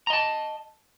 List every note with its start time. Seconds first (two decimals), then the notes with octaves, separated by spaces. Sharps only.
0.07 A#5
0.10 D#5
0.13 A5